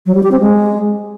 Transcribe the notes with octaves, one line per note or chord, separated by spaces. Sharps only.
F#3
G3
G4
C4
G#3